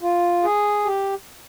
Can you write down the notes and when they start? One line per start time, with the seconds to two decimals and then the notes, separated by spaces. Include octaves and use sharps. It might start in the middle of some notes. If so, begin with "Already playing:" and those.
0.02 F4
0.43 G#4
0.85 G4